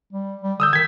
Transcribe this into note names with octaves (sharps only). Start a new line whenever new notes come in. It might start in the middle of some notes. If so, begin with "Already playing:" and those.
G3
G3
D3 D#6 E6 G6
D#3 G#6 B6